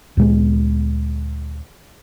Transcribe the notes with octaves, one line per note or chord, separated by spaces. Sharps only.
D2 A#2 G#3 B3